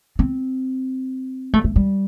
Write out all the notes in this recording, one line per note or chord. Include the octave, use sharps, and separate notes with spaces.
C4
A3
A3
G3